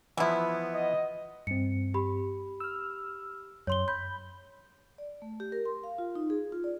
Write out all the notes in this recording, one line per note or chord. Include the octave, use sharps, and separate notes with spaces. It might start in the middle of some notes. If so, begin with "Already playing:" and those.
E3 F3 G#3 B3 E4
D#5
G2 C4 C#7
G4 B5
E6 F6
F#2 C#5 C6 G7
B5 G6
D5
A3
G4
A#4
C6
F5
F4
D#4
G#4
F4
D5